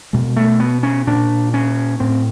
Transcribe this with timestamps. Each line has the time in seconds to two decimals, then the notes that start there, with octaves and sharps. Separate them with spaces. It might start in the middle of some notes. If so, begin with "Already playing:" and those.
0.13 B2 G#3
0.37 A3
0.60 B3
0.83 C#4
1.07 A#2 D4
1.54 C#4
2.00 A2 C4